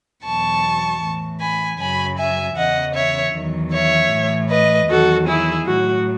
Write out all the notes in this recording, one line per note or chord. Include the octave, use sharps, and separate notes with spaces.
E2 B2 F#3 A5 C#6
A2 E3
G#5 B5
F#2 C#3 F#3 G#5 B5
E5 G#5
E2 C#3 E3 D#5 F#5
C#5 E5
E2 D#3 F#3
C#5 E5
A2 E3
B4 D#5
E2 D#3 F#3 F#4 A4
E4 G#4
A2 F#3 F#4